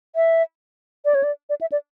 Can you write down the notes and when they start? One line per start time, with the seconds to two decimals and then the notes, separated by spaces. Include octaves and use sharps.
0.16 E5
1.05 D5
1.15 C#5
1.23 D5
1.50 D5
1.61 E5
1.72 D5